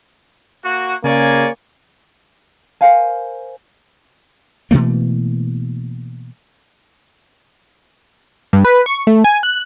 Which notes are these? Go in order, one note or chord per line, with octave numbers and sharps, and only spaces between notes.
A#3 F#4
C#3 A#3 C#5 D5 G#5
A#4 C5 F5 G#5
B2 E3 A3 A#3
G2
B4
C#6
A3
G#5
F#6